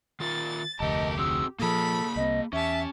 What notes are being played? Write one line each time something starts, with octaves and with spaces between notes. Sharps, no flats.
D#3 F4 A#4 A6
F1 D2 A3 G4 A#4 D#5 A5
C4 F#4 G#4 E6
A#2 F3 A#3 G#4 A4 B5
C2 C4 D#5
E2 C#4 G4 E5 A5